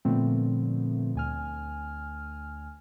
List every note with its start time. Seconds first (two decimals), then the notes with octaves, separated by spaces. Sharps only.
0.05 A#2 D3 F3 A3 B3 C4
1.15 D2 G#5 F6